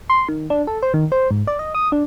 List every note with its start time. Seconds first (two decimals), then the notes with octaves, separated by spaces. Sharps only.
0.10 C6
0.29 D#3
0.50 D4
0.67 A4
0.83 C5
0.94 D#3
1.12 C5
1.31 G#2
1.47 D5
1.59 D#5
1.75 D#6
1.92 D4